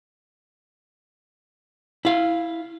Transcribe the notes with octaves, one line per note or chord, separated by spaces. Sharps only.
E4 F5